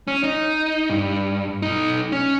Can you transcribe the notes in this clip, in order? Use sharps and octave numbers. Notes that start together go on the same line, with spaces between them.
C#4
D#4
G2
B1 D#4
C#4